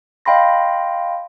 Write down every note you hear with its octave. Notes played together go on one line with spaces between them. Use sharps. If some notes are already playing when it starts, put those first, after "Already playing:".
D#5 F5 G5 B5 C6 A#6